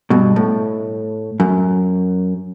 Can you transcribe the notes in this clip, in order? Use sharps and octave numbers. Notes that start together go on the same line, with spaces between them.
G2 B2
A2
F#2